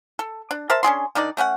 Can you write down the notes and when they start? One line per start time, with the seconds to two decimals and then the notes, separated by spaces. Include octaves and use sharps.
0.19 A4
0.51 D4
0.70 A#4 C5 E5 A5
0.83 C#4 D4 G#4 C6
1.15 D#3 D4 D#4 D5
1.37 A3 C#4 A#4 F#5